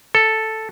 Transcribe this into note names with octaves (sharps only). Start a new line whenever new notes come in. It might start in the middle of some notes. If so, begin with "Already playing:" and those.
A4